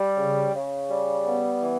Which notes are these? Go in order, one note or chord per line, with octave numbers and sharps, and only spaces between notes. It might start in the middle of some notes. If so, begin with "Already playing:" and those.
Already playing: G3
C#3
C#3
G3
B3
E3